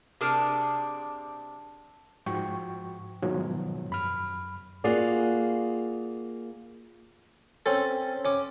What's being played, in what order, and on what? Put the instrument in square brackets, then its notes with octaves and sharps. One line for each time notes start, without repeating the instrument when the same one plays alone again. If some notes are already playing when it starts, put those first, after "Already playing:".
[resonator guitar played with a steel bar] C3 D4 G#4 A#4 A5
[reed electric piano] G#2 F3 F#4 G5 C#6
G#2 B2 D#3 F3 F#3
F#2 B5 F6
[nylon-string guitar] A#3 F4 F#4 G#4 D5
[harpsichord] C4 C#4 A4
C#4 D6